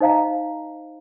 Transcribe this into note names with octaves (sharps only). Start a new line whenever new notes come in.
D#4 C5 D#5 F5 A#5